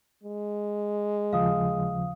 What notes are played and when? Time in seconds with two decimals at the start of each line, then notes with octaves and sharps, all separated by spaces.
0.23 G#3
1.33 D#2 C#3 F3 F5 D#6